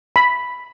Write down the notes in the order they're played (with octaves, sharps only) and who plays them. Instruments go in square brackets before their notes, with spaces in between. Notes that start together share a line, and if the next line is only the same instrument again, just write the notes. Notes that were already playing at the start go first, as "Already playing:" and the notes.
[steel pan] B5